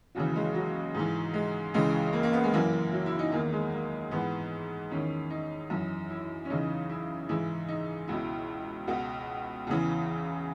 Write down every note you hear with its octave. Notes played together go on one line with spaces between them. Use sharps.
D#2 C#3 E3 F#3
G#3
F#3
G#2 E3
G#3
C#2 C#3 E3 G#3
A#3
A#3
B3
G#3
F#2 E3 A#3
F#3
E4
D#4
E2 D#3 A#3
G#3
A#3
G#2 E3 B3
E2 D#3 C#4
D#4
F#2 E3
E4
C#4
E2 C#3 E3 D#4
E4
G#2 E3 E4
D#4
C#2 B2 E4
C#2 B2 F#4
E2 C#3 E3